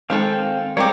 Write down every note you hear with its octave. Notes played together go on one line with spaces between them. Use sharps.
D#3 G#3 C4 A4 F5
G3 G#3 A#3 C4 G4 A#4 C#5